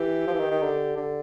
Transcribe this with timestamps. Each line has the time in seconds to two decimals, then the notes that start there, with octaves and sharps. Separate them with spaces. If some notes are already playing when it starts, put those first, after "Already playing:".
Already playing: E3 G4
0.27 F3
0.34 E3
0.40 D#3
0.51 D#3
0.62 D3
0.97 D3